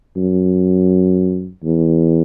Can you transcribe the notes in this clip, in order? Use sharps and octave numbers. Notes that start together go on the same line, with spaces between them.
F#2
E2